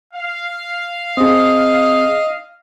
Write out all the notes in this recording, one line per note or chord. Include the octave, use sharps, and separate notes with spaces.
F5
C4 G#4 D#5 D#6